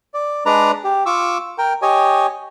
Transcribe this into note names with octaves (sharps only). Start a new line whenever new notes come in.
D5
G#3 D4 B4 D5 A#5
G4
F4 C#6 D6 E6
A#4 G5
G4 C#5 D#5 G#5